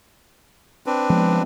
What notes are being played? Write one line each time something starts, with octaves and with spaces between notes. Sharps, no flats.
C4 D4 B4
F3 G#3 B3